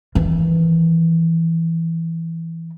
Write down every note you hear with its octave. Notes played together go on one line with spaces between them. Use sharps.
D#3 E3